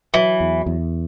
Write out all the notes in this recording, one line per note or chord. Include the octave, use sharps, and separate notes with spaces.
E3 F#3
E2
E2